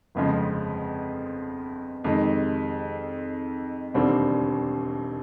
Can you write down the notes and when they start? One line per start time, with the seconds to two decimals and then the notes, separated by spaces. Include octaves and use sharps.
0.15 G1 F2 C#3 F3 G#3
2.04 F2 C3 D#3 G#3
3.94 E1 D#2 D3 G3 C4